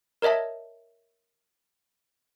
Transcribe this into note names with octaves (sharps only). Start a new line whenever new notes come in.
A#4 C#5 D#5 E5 A5